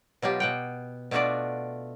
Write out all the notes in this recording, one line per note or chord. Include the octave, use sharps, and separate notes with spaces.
B2 F#3 F4 G4
B2 F#5 G5
B2 A3 D4 F4 F#4 D5